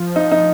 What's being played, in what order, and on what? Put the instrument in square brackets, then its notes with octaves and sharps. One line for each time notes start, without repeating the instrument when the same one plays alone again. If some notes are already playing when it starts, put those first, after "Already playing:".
Already playing: [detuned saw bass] F3
[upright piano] D#4
D#4